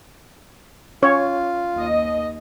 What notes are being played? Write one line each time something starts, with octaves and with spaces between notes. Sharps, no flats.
C#4 F4 C#5
D#2 D#5